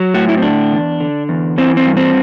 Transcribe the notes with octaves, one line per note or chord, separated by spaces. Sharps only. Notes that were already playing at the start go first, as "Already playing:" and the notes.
Already playing: F#3
A2 F#4
E4
C4
D3 D4
E2
D3
E2
E3 C4
C4
G2
C4